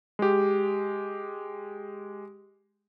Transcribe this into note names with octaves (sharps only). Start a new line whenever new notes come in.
G#3 G4